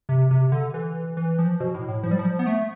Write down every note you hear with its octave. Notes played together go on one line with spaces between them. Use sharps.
C3
C3
D3
E3
E3
F3
B2
A2
A2
F3
G3
F3
B3
A3